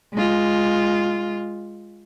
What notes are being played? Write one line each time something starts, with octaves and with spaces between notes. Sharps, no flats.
G#3 F4